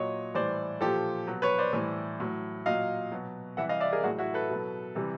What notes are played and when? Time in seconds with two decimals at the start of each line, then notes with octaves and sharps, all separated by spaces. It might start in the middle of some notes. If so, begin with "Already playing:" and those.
Already playing: A#2 F#3 C#5 D#5
0.35 A2 E3 G3 C5 D5
0.81 A#2 F3 G4 A4
1.27 B2 F#3
1.42 B4 C#5
1.58 C5 D5
1.73 A2 E3 G3
2.20 A2 F#3
2.66 A#2 F#3 D#5 F5
3.12 B2 F#3
3.57 C3 E3 G3 E5 F#5
3.69 D#5 F5
3.80 D5 E5
3.92 G#4 A#4
4.03 A2 F#3 F#4 G#4
4.19 E4 F#4
4.34 A4 B4
4.50 B2 F#3
4.95 C3 E3 G3